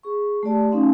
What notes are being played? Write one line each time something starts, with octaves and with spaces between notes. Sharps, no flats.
G#4 C#6
A3 G4 D5 A5
A3 C#4 D#4 F5 C6